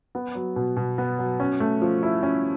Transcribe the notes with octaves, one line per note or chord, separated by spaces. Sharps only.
B3
F#3
B2
B2
B3
F#3
C#4
A3
F3
E4
C#4